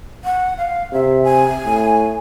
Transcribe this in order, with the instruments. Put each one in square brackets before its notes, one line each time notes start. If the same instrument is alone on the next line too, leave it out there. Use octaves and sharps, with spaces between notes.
[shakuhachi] F#5
F5
[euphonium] C3 [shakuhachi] E5
[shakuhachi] G#5
[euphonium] A2